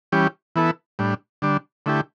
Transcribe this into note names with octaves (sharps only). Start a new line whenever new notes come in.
E3 G3 C#4 G4
E3 B3 E4 A4
A2 G3 D4
D3 G3 D4
D3 A3 E4 G4